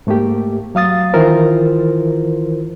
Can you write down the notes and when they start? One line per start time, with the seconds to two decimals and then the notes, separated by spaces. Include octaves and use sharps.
0.07 G#2 A3 A#3 G4
0.75 F#3 F5 D#6 A6
1.13 D#3 E3 E4 F4 A#4 C5